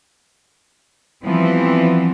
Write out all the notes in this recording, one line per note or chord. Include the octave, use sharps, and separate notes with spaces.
E3 F3 G3 B3 C4